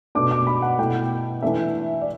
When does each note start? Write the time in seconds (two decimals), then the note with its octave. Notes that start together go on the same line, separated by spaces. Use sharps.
0.15 B2 A3 D4 D6
0.31 D6
0.47 B5
0.62 F#5
0.79 B2 A3 E4 G5
1.42 E3 A3 D4 E5
2.02 D5